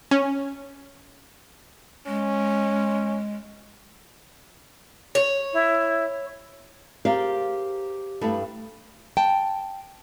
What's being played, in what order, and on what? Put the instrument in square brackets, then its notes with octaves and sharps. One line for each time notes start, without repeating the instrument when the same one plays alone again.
[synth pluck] C#4
[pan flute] G#3 [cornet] C#4
[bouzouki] C#5
[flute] E4
[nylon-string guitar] G4 G#4 A#4 C5 D5 F5
G2 A3 B3 E4
G5 A5